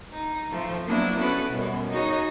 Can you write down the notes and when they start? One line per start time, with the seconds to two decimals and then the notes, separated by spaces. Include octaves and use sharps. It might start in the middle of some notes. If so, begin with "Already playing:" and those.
0.12 D#4
0.51 F3 A3 C4
0.85 F#3 A#3 B3 D4 E4
1.18 B3 C#4 E4 F#4 A4 B4
1.50 F#2 B2 G3
1.91 D#4 F#4 G#4 C#5 D#5